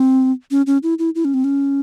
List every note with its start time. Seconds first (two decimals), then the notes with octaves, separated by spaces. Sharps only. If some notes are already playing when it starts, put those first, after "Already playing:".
Already playing: C4
0.51 C#4
0.67 C#4
0.83 E4
0.99 E4
1.15 E4
1.25 C#4
1.34 C4
1.44 C#4